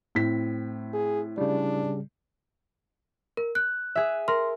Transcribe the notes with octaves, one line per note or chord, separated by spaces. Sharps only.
A2 C4 B6
G#4
C#3 G3 D4
A#4
F#6
G#4 E5
A#4 C6